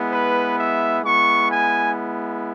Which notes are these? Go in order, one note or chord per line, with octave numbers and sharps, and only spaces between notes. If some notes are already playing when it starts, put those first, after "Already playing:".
Already playing: G#3 B3 E4
B4
E5
G#3 B3 E4 C#6
G#5